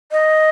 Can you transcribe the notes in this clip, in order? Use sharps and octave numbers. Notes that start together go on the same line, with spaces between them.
D#5